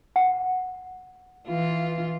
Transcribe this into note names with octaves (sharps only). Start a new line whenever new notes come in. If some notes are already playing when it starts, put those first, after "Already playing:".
F#5
E3 F4